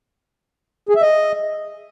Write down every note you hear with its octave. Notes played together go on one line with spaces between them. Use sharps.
G#4
E5
D#5